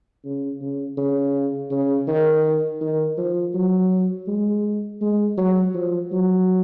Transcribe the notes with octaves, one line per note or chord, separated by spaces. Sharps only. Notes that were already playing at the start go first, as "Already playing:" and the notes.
C#3
C#3
C#3
C#3
D#3
D#3
F3
F#3
G#3
G#3
F#3
F3
F#3